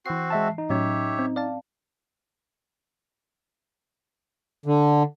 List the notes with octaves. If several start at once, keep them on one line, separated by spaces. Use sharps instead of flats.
E3 C4 F#4 C7
G#3 E5 A5
D#4
A2 F#3 C#4 G4 C#5 E5
C4
D5 F5 A5
D3